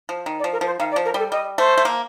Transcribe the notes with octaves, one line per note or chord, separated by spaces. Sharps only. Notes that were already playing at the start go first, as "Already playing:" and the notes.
F3
D#3
D5
F3
A#4
F3 C5
D#3 F5
D5
F3
A#4
G3 A4
G3 D#5
A3 C5
A3
A#3